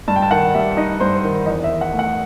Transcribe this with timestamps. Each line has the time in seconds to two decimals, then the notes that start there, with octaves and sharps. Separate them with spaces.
0.08 G2 A5
0.16 G5
0.22 A5
0.31 D#3 F#5
0.55 G3 E5
0.77 D#4 D#5
1.00 G2 C5
1.24 D#3
1.46 E2 D#5
1.64 E5
1.69 D#3
1.81 F#5
1.93 A3
1.99 F#5